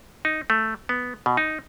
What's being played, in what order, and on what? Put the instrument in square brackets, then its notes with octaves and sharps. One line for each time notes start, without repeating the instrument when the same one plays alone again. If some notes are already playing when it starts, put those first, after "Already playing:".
[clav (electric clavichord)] D#4
A3
B3
B2
D#4